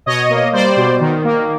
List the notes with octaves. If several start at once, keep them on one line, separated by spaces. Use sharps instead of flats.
B2 C#5 D#5
A#3
G3 C5 D5
B2
D#3
A#3